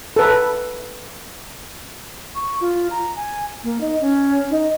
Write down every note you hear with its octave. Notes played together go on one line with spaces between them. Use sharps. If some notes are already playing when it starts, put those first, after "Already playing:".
A4 B4
C#6
F4
A#5
G#5
A#3
D#4
C#4
D#4